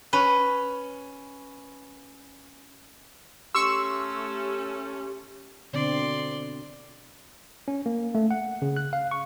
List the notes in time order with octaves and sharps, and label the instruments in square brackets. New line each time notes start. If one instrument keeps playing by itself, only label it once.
[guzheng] C#4 B4
[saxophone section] A3 C#4 [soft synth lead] G4 [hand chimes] C6 C#7 [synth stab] C#6 E6
[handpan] B2 D3 C4 [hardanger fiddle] D5 C6
[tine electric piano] C#4
A#3
A3
F#5
C#3
F#6
F5
C#6